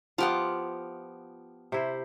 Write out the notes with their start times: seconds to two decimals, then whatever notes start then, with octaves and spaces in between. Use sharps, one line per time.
0.18 F3 B3 F4 G4 F#5
1.72 C3 E4 C5